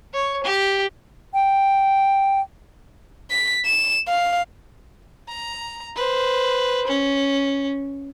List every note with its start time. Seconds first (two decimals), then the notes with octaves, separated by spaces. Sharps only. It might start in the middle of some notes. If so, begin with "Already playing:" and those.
0.14 C#5
0.44 G4
1.34 G5
3.31 B6
3.65 E7
4.08 F5
5.28 A#5
5.96 B4 C5
6.87 C#4